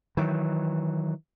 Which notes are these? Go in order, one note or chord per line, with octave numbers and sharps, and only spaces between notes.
D#3 E3 F#3